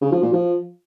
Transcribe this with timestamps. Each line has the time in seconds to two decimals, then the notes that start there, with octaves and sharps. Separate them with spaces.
0.02 C#3
0.12 F3
0.23 A#2
0.33 F3